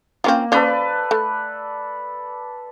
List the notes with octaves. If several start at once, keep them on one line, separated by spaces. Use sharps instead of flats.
A#3 C4 C#4 F4
F3 C#4 A4 B4 D5
A3